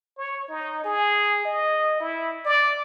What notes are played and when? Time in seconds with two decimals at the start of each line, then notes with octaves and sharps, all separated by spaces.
0.18 C#5
0.49 D#4
0.85 G#4
1.45 D#5
2.00 E4
2.46 D5